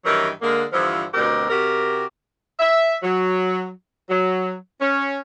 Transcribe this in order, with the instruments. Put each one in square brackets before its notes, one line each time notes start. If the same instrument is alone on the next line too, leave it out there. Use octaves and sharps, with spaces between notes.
[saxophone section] G2 D#3 E3 F#3 A#4
D3 G#3 A#3
G2 D3 E3 F3
D2 B2 C4 G4 A#4
C3 F#4 G4 A#4
E5
F#3
F#3
C#4